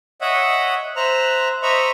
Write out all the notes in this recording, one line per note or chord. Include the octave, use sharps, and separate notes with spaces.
C#5 D#5 E5 F#5
C5 E5 A#5 F#6
C5 D#5 E5 A#5 B5 C#6